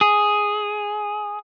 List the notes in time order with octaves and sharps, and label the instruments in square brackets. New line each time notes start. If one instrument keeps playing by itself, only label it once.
[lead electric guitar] G#4